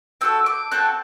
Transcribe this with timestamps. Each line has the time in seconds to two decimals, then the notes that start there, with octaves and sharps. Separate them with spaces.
0.21 C4 F#4 A4 E6
0.46 D6
0.72 C4 F#4 A4 F#6